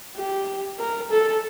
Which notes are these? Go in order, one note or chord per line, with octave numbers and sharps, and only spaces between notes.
G4
A#4
A4